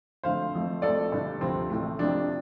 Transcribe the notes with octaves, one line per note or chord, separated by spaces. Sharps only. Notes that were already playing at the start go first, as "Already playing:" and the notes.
F2 D3 F3 A3 C5 F5
F2 F3 A3
F1 F2 F3 A3 A4 D5
G1 G2 D3
D2 C3 F3 C4
A1 A2 A3
F2 C3 F3 A3 D4